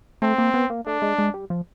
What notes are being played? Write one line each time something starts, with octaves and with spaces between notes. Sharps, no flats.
A3 C4
A#3
B3
A#3
A3 D4
G#3
G#3
G3
F3